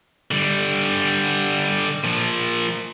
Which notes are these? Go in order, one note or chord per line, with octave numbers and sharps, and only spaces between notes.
D3 G3
A#2 F3